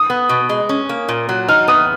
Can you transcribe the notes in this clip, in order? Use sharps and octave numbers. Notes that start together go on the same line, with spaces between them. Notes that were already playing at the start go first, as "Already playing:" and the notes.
Already playing: D#6
B3
B2
G#3
C#4
A#3
A#2
F#3
D#4 F6
B3 D#6